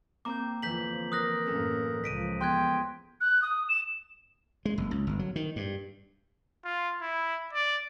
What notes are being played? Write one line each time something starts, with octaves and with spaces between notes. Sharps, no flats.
A#3 C4 A#5 D6 G6
E2 D3 E3 F3 G6 B6 F#7
A#4 C6 D#6 F#6 A#6
F#2 A2 A#3 C#4 A4
C#2 F3 B6 D7 D#7
E2 G5 C6 F#6 G#6
F#6
D#6
E7
G#3
F#1
C#2
G1
F#3
D#3
G2
F4
E4
D5